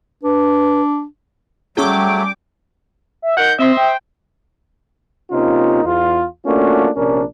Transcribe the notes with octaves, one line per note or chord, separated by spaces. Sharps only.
D4 B4
F#3 G3 A3 C#4 G#4 G5 D6
E5
D#3 A#4 F#5 G6
C4 C5 D#5 E5
G5
C3 A#3 C#4 D#4 F4
E2 F4
A3 A#3 C#4 D4 F4 F#4
A#1 C3 C#4 D4 A#4